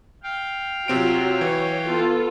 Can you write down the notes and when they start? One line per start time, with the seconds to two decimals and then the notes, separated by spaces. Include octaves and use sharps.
0.23 F5 G5
0.88 C3 F#3 C4 F4 D7
1.41 E3 C#5
1.87 B3 F4 A4